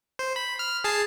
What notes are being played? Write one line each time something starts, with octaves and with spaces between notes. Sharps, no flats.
C5
B5
F6
G#4 A5 C7